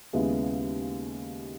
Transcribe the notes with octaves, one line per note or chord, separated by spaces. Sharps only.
D#2 C#3 G#3 B3 E4